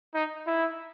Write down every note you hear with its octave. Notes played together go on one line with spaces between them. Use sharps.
D#4
E4